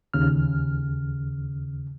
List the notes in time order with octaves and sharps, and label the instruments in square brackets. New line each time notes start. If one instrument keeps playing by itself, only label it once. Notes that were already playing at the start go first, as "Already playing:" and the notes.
[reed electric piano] D#2 C#3 F6